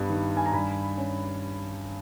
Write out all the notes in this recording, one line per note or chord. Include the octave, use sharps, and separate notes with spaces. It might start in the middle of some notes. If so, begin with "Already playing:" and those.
Already playing: G2 G3 B3
D#3
G#5
A#5
G2 G#5 B5
C#4